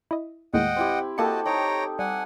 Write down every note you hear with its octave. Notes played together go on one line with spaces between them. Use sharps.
E4 D#5
D#2 A2 G#3 D#5 F#5 G5
C4 E4 G4
A#3 E4 F#4 G4 A4 D#5 A5 C#7
D#4 C#5 G5 A#5
G3 F#5 G#5